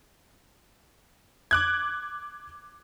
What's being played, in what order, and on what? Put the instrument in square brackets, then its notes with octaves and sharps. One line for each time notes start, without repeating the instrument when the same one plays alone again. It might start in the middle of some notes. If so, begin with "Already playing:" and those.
[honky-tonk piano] D6 F#6 G#6